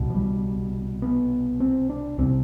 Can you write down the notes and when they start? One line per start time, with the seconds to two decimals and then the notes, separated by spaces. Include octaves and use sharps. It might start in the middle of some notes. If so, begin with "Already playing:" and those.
Already playing: C2 B2
0.10 F3
0.15 G3
1.02 B3
1.60 C4
1.90 D4
2.18 C2 C3 C4